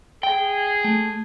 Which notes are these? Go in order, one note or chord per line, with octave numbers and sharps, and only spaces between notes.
G#4 G5
A3